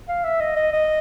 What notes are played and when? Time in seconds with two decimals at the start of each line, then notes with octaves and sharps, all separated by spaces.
0.09 F5
0.24 E5
0.40 D#5
0.56 D#5
0.72 D#5